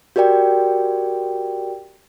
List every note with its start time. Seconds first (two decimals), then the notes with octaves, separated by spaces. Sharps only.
0.16 F#4 G4 A#4 D5 G5